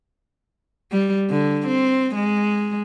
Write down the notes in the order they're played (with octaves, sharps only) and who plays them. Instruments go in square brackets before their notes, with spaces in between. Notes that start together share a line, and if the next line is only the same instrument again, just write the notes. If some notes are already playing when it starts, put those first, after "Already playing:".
[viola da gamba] G3
D3
C4
G#3